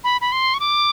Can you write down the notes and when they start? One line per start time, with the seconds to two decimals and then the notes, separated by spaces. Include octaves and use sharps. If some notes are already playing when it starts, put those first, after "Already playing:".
0.04 B5
0.21 B5
0.32 C6
0.54 C#6
0.60 D6